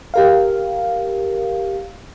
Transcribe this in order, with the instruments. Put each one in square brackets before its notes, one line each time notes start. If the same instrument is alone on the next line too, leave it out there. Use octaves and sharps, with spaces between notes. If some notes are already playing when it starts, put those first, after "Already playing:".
[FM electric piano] G4 A#4 F5